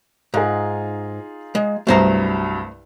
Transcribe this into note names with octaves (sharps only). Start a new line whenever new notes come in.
G#2 D#4 F4 G#4
G#3
C2 G2 F#3 A3 C5 A#5